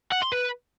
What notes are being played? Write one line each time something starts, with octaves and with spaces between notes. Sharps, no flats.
F#5
C6
B4